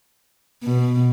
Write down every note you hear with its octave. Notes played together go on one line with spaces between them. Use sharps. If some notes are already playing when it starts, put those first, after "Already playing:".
B2